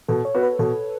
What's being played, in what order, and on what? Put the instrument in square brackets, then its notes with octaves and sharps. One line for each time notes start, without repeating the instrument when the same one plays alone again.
[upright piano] B2 [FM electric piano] A4
[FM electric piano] C#5
[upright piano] B3 F#4
[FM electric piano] B4
[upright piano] B2 [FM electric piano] A4